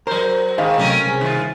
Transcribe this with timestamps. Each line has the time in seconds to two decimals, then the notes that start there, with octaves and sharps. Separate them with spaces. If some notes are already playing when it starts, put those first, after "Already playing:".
0.07 F#3 A#4 C5
0.58 G#2 D#3 G#4 D#5 F5
0.78 C3 F#3 A3 C4 C#4 A#4
1.06 C2 G#4
1.21 D#3 F4